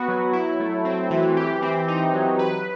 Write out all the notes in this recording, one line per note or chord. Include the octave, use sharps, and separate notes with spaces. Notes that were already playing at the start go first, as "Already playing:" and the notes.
Already playing: B3 F#4 B4
F#3
E4
A3
C4
E3
G4
C4
D#4
F#3
B4